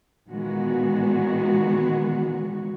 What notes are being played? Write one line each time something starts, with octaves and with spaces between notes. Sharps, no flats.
A#2 D#3 E3 G#3 B3 F#4